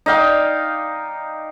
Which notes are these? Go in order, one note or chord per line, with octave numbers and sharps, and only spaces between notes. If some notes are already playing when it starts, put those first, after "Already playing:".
D#4 D5 F5 G5